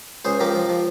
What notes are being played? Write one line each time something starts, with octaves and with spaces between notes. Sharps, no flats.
C#2 G#4 C5
F3 G4 A#4
F3
F3